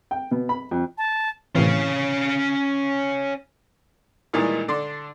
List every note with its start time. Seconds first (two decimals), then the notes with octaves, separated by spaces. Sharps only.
0.11 G5
0.31 B2
0.49 B5
0.71 F2
0.98 A5
1.55 A2 C3 E3 C#4 F5
4.33 A#2 D#3 E3 G3 G#3
4.68 D3 D4 C6